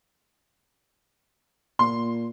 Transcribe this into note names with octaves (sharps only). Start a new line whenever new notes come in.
A#2 C6